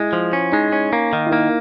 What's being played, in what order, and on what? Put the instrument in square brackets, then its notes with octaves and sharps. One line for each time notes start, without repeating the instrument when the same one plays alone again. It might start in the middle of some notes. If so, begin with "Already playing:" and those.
Already playing: [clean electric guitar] G#3 [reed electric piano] E4
[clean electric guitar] F3
C#4
[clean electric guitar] G#3 [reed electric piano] D#4
[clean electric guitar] C#4
A#3
D#3
[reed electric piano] E4
[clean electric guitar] A#3 [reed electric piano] D#4